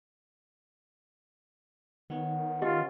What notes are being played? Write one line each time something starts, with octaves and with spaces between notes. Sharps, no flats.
D#3 B3 C#5
C#4 F4 G4 D#5